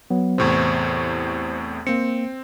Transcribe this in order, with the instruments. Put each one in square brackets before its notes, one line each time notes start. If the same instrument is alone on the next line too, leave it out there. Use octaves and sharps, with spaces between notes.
[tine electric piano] F#3 B3
[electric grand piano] E2 A2 C3 [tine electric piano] C5 C#6
[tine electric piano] A#3 C#7 [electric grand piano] C4